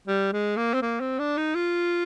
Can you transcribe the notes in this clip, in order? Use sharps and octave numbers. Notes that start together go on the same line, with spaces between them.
G3
G#3
A#3
C4
A#3
C4
D4
D#4
F4